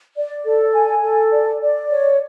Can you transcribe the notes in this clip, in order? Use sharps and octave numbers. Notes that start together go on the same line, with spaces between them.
D5
A4
G#5
A4
D5
D5
C#5